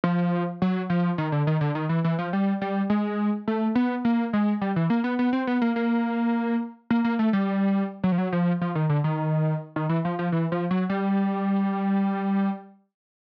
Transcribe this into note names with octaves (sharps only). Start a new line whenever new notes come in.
F3
F#3
F3
D#3
D3
D#3
D3
D#3
E3
E3
F3
G3
G3
G#3
A3
B3
A#3
G#3
G3
E3
A#3
B3
B3
C4
B3
A#3
A#3
A#3
A#3
A3
G3
F#3
F3
F#3
F3
F3
D#3
D3
D#3
D#3
E3
F3
F3
E3
F3
F#3
G3